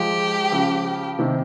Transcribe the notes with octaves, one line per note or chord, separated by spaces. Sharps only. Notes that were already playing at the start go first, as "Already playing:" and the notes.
Already playing: F3 G#3 G4
C#3 F3
C3 D#3